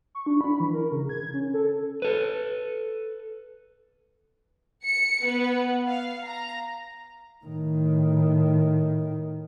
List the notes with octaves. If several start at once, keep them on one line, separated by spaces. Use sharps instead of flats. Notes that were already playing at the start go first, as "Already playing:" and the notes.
C#6
D4
B5
E3
A#4
C#3
G#6
C#4
A4
A4 B4
C#7
B3
F5
A#5
A2 D#3